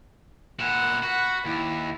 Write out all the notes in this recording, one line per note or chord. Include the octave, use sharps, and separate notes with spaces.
A#2 E4 F#5
F#4 F#5 B5
D#2 E4